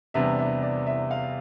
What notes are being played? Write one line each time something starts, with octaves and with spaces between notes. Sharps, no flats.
E2 C3 G3 B3 D4 E5
E5
D5
E5
F5